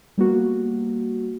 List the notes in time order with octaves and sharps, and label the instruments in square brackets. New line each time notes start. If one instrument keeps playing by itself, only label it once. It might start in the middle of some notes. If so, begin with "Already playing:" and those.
[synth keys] G3 A#3 B3 F#4